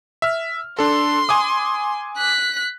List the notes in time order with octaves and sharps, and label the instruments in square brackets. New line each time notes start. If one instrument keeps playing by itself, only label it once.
[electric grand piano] E5 F6
[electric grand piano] D4 A4 [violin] C6
[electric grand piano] G#5 D6 D#6
[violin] F#6 B6